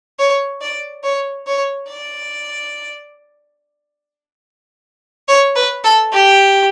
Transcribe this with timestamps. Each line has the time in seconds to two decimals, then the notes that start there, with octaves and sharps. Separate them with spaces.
0.19 C#5
0.61 D5
1.04 C#5
1.47 C#5
1.89 D5
5.28 C#5
5.56 B4
5.84 A4
6.13 G4